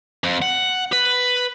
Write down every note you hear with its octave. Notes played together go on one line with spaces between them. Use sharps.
F2
F#5
B4